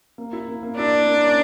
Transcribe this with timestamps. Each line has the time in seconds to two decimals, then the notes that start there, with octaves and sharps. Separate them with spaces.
0.18 A#3
0.33 E4
0.48 A#3
0.63 A#3
0.77 D4 E4
0.92 A#3
1.08 A#3
1.23 C#4